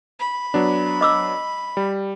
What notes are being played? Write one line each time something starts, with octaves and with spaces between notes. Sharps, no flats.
B5
F#3 B3 D4
D#5 D6 E6
G3